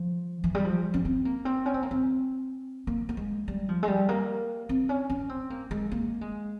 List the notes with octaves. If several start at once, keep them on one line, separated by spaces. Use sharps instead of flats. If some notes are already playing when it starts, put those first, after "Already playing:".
Already playing: F3
E3
G3
F3
C#4
C4
A#3
C4
C#4
C4
A#3
C4
A#3
A#3
G#3
G3
F3
G#3
G3
A#3
C4
C#4
C#4
C4
A#3
G#3
A#3
G#3